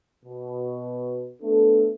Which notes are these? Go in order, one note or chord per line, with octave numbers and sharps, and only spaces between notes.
B2
A3 B3 D4 A4